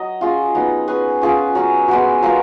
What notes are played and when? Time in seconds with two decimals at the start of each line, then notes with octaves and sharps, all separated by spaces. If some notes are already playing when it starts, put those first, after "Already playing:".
Already playing: F#3 D#5
0.21 C#4 F4 G#4
0.55 F#3 B3 D#4
0.87 C#4 G#4 B4
1.21 C#4 F4 G#4
1.55 F#3 C#4 F#4
1.88 G#3 B3 F#4
2.22 F#3 B3 F4 A#4